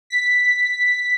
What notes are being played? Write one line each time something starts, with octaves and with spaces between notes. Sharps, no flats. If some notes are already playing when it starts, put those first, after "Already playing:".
B6